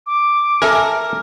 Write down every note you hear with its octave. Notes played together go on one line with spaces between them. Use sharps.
D6
A4 A#4 E5 G#5